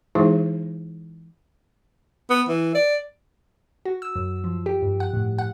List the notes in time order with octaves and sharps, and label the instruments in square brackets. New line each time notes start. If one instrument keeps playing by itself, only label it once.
[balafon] E3 G#3 D#4 E4 G#4 C5
[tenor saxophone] B3
E3
D5
[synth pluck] F#4
E6
F#2
F3
G4
G2
F#5
A2
F#5